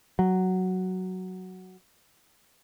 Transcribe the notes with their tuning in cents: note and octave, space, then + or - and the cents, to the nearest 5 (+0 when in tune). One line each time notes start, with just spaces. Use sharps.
F#3 +5